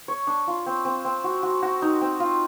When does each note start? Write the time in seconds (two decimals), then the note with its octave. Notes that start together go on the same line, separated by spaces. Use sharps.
0.08 C#5
0.27 D4
0.47 F4
0.66 C4
0.85 C4
1.05 C4
1.24 F#4
1.43 F#4
1.62 F#4
1.82 D#4
2.01 C4
2.20 F4